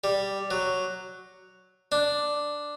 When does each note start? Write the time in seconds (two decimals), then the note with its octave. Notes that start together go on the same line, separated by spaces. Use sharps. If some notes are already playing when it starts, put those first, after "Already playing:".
0.04 G3
0.51 F#3
1.92 D4